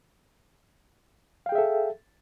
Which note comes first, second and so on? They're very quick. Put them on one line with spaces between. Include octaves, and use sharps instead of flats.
F5 G5 G#4 E5 A4